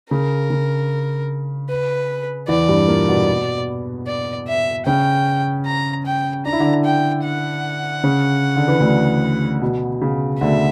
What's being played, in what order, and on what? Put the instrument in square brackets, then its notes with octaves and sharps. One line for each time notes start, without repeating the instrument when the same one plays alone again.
[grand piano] C#3 [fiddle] A#4
[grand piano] C#3
[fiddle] B4
[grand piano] E2 E3 [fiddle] D5
[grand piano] G2 G3
A#2 A#3
B2 B3
[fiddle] D5
E5
[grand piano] C#3 C#4 [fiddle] G5
[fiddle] A#5
G5
[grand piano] D4 [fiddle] A#5
[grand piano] E4
D3 D4
[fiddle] G5
F#5
[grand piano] C#3 C#4
D3
E3
D2 D3
B2
C#3
[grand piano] D2 D3 [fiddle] E5